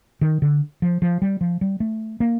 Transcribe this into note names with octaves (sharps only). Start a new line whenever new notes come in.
D#3
D3
F3
F3
G3
F3
G3
A3
A#3